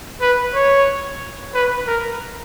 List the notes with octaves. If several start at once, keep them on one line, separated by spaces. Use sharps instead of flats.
B4
C#5
B4
A#4